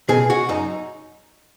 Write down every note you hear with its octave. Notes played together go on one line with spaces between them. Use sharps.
B2 G#4
F#4
F#2 D#4